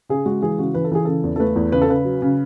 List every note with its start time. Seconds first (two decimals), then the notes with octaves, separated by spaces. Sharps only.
0.09 C#3 G#4
0.26 G#3 F#4
0.42 E3 G#4
0.59 C#3 F#4
0.74 E3 B4
0.84 A4
0.92 E3 G#4
1.05 C#3 A4
1.24 E2
1.36 A4
1.40 A3 B4
1.56 E2
1.72 C#3 B4
1.82 A4
1.89 C#3 B4
2.05 F#3
2.22 C#3